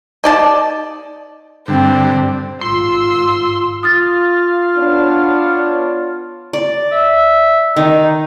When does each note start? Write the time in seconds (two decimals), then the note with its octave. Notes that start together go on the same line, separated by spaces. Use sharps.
0.24 D#4 D5 A5
1.68 G2 D3 C4
2.61 G#1 G#2 F4 C6 E6
3.83 F4 F5 D#6 F6 A6
4.76 B3 D4 C#5
6.53 D5
6.92 E5
7.76 D#3 D#4